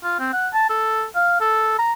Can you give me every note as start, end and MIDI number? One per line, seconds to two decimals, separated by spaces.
0.03 0.16 65
0.20 0.32 60
0.33 0.48 78
0.54 0.69 81
0.70 1.04 69
1.15 1.37 77
1.41 1.77 69
1.79 1.93 82